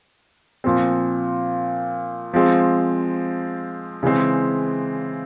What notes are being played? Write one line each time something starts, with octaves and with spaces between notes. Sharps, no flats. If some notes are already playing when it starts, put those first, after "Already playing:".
A#2 F3 C4
F3 G#3 C4
C#3 E3 G#3 C4